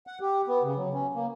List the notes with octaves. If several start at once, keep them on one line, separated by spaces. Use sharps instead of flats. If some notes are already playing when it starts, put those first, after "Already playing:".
F#5
G4
B3
C#3
F#3
C#4
A#3